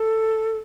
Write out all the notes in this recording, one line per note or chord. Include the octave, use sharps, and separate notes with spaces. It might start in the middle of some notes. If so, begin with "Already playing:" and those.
Already playing: A4